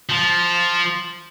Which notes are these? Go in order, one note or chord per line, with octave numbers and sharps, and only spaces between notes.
F3